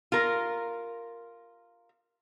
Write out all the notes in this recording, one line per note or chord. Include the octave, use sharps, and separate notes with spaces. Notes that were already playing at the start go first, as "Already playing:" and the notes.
F4 A#4